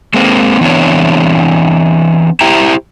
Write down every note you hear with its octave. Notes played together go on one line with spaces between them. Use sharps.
G#3 A#3 C4
E3 B3 C4 D4 C#5
E4 G4 C5 E5 G5 A#5